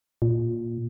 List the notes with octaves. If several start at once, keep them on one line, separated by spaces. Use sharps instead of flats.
A#2